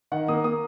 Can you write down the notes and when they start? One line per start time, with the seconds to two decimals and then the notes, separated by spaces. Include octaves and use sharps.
0.12 D#3 F#5
0.28 A#3 D#6
0.44 A#3 D#6